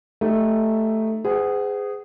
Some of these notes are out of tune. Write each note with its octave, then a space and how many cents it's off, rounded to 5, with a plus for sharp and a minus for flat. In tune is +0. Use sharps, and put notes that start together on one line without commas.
A3 +0 D#4 -5 G4 +0
G#4 -10 C5 -45 F#5 +25